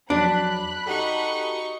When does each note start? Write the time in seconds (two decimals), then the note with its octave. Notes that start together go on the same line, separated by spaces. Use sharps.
0.10 F2 F#3 D4 B5 F#6
0.86 D#4 F#4 G4 A4 C#6